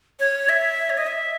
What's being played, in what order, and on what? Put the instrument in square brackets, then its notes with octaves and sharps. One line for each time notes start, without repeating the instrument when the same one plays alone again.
[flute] C#5
E5
C#5
D#5
E5